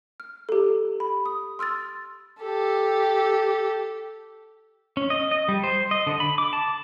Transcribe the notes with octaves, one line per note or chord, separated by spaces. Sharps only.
F6
G4 A4
B5
D#6
C6 E6 F6 A6
G4 A4
C#4
D#5
D#5
G3
C5
D#5
D3
B5
D6
A5